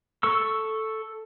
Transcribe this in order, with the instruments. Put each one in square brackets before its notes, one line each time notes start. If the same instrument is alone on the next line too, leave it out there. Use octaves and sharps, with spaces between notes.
[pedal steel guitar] A4 C#6 E6